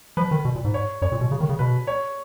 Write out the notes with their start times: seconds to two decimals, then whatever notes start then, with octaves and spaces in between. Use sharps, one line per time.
0.17 F3 B4
0.31 D#3
0.45 B2
0.55 A#2
0.65 G#2
0.74 C#5
1.02 F#2 C#5
1.12 A#2
1.21 B2
1.31 C#3
1.40 D#3
1.49 C#3
1.59 B2 B4
1.87 C#5